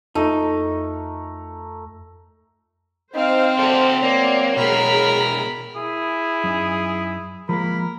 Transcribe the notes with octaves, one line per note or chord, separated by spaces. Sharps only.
F2 A3 D#4 A#4
C4 D#4 C5 F5
F#4 A4 C5 D5
F#3 A#3 D5
B2 G#3 G#4 A#4 A#5 B5
E4 G#4
F#2 D#4
F3 G#3 A#3 A#4 B5